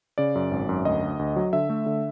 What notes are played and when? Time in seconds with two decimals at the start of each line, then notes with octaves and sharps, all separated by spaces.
0.18 C#3 D5
0.35 F#2
0.51 G#1
0.69 F#2
0.85 D2 D#5
1.02 D2
1.19 D2
1.36 F#3
1.53 D3 E5
1.70 A3
1.86 D3